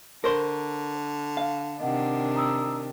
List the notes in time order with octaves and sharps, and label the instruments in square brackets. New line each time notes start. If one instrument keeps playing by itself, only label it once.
[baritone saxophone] D3 [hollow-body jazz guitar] A#4 C5 [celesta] C#6
[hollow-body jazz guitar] F5
[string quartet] C3 D#3 D4 [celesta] D#5 F#5
[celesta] A#5 D#6 E6